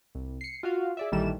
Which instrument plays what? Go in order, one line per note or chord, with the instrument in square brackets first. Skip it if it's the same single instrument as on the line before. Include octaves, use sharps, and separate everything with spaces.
[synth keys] C2
C7 C#7
F4 F#4 F5
G#4 D5 E5
A#1 D#3 E3 G3 A4 E7